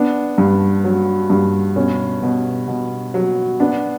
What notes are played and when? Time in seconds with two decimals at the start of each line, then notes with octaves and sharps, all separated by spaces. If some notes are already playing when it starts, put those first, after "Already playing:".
Already playing: B3 D4
0.38 G2
0.84 F#3
1.30 G2
1.76 B2 C#4
2.23 B2
2.68 B2
3.14 F#3
3.60 B3 D4